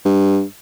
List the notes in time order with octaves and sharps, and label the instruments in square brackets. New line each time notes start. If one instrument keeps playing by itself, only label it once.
[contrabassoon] G2